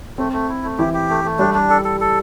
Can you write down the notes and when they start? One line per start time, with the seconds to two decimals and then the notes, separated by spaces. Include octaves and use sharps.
0.18 A3 C4
0.33 A3
0.49 E4
0.64 A3
0.78 E3 E4 G4
0.94 G4
1.10 A3
1.24 A3
1.39 G3 D4 G4
1.54 D4
1.70 A4
1.85 A4
2.00 A4